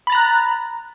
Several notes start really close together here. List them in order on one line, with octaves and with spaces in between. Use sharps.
B5 A6 A#5 F#6